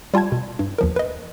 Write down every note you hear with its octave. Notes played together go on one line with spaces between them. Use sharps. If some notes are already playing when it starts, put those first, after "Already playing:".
G3 F4 G5 A5 G#6
B2
G2
D#2 F3 A#4
B4 D#5